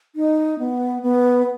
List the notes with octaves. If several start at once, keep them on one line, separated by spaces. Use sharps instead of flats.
D#4
B3
B3